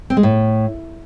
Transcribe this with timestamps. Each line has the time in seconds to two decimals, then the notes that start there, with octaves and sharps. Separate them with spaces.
0.10 C4
0.17 G#3
0.23 A2